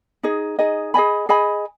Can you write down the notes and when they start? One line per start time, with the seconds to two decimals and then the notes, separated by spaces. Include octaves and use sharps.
0.23 D#4 G#4 D#5
0.59 D#4 G#4 D#5
0.94 G#4 D#5 G#5 B5
1.29 G#4 D#5 G#5 B5